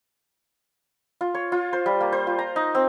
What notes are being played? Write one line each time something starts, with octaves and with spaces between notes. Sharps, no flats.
F4
C#5
F4
C5
G3
A#3
C5
F4
A#5
D#4
C4